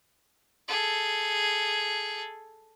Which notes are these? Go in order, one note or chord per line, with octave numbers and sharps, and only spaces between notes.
G#4 A4